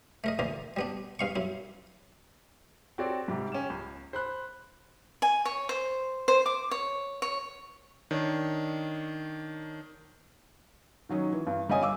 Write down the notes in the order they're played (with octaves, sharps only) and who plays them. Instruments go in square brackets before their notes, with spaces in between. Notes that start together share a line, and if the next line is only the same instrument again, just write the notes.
[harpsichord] A3 A#4 D#5
D3 E3 A#3
G3 B3 D4
G2 F5 C#6
F#2 E4
[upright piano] C4 F#4 G4 A4 C#5 D5
G#2 C3 G3
C#4 G4 E7
C#2
C5 B5 F#6
[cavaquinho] G#5
C#5
C5
C5
D6
C#5
C#5
[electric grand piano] D#3 D4 C#5
[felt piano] D#3 F#3 C#4 D#4
E3
G2
G1 G3 C#4 D#5 G#5 D#6
F5 D6 E6